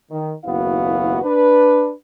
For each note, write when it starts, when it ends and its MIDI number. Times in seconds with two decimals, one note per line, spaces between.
0.11 0.32 51
0.45 1.18 30
0.45 1.18 39
0.45 1.18 59
0.45 1.18 64
0.45 1.18 66
0.45 1.18 77
1.23 1.91 62
1.23 1.91 71